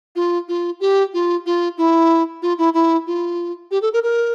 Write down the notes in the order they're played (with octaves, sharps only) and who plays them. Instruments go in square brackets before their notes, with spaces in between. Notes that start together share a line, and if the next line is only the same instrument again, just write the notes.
[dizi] F4
F4
G4
F4
F4
E4
F4
E4
E4
F4
G4
A4
A#4
A#4